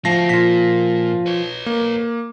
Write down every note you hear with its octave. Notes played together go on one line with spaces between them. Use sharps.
F3 A3 F#4 A#6 C7
A#2 F4 B6
B4 C#5
A#3